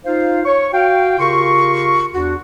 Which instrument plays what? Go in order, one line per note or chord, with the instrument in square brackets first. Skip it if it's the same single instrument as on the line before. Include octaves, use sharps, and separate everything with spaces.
[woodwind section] D#4 F4 C5 F5
C#5 C#6
F#4 F5 G5
C#3 F4 G4 A#4 C6 C#6
E2 D4 F#4